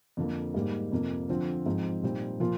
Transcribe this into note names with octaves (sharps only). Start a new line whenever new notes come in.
F2 D3 F3 A#3
G#2 G3 A#3 D#4
F2 C3 F3 A#3
D3 F3 C4 F4
G#2 F3 C4 D#4
A#2 G3 C4 D#4
A#2 F3 A#3 F4